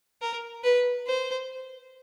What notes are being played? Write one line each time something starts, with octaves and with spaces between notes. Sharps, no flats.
A#4
B4
C5